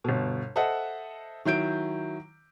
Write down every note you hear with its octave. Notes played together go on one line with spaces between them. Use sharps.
G1 B2
A4 C5 D#5 E5 F#5
D#3 F#3 E4 G6 D7